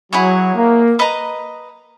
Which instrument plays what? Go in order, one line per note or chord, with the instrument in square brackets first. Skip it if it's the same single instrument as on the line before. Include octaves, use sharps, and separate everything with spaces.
[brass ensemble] F#3 [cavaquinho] E4 G#4 C#5 F#5
[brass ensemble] A#3
[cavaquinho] B4 D#5 A#5